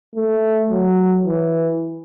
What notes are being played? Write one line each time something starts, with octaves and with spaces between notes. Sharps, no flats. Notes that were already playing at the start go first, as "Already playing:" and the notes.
A3
F#3
E3